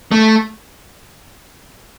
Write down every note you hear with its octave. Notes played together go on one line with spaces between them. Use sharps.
A3